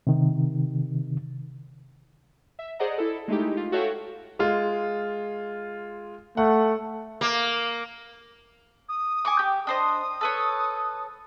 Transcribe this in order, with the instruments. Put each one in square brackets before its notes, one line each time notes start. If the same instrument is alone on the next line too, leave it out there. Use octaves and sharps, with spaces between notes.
[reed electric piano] C3 D#3
[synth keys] E5
G#4 C5 D5 D#5 F#5 A#5
E4 A4
G#3 A3 D#4 E4 G4
F4
F#4 A4 C#5 E5 F5 G5
[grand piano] G#3 F4
[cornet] A3 [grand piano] F#5
[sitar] A#3
[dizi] D#6
[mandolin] G#5 C#6 D6
G4
[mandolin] D4 C5 D#5 [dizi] D#6
[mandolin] A4 B4 C#5